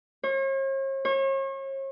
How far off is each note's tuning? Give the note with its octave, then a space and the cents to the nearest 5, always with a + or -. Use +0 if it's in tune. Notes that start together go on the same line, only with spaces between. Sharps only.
C#5 -45
C#5 -40